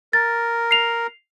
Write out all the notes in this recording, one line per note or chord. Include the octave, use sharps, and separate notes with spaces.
A#4 A6
C7 F7